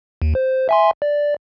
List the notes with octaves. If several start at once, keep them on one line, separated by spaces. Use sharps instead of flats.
D#2
C5
E5 G#5 C6
D5